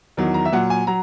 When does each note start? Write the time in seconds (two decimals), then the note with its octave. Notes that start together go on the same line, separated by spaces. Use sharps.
0.17 E2 D#3 F#3
0.34 A#5
0.45 E5
0.52 A#2 F#3 F#5
0.70 G#5
0.87 F#3 A#5